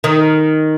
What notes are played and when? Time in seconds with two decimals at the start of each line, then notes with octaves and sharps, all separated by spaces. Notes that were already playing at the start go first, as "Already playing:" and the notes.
0.04 D#3